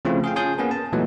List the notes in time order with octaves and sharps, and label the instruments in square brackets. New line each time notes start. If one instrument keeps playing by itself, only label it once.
[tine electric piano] C#3 F3 A3 C4 E4 F4
G#4 F5 G5
C#4 F4 G#4 A5 D#6 G6
A#3 B3 C#4 G#4 B4
A5
A#2 E3 F#3 G#3 A3 B3